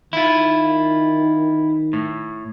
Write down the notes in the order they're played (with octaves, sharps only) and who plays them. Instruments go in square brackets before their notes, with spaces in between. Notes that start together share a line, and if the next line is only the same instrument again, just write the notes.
[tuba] D#3 [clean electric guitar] E4 F4
[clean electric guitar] A2